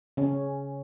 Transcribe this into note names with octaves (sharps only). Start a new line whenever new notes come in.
C#3 C#4